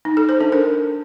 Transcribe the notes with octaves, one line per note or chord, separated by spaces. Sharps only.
D#4
A4
C5
D4
A#4